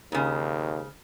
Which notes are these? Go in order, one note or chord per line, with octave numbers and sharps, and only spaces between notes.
D#2 G#2 C#3